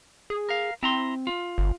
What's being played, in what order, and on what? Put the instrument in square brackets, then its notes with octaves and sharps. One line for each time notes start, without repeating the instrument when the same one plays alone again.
[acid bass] G#4
[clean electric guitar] A#4 F5
[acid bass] C4 [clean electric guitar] E4 A#5 C6
[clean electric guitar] F4
[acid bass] G1